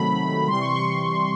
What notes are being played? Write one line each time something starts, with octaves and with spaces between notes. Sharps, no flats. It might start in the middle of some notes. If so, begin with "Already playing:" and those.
Already playing: C3 D#3 F#3 A3 B5
C3 E3 G3 C6
C#6
C#6